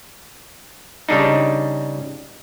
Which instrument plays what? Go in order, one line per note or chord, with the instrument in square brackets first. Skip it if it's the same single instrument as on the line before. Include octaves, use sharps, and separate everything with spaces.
[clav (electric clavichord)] C#3 G3 D4 D#4